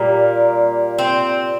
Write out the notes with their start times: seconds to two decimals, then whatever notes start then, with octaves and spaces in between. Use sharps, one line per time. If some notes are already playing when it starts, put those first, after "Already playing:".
Already playing: A#2 G3 A#3
0.98 C4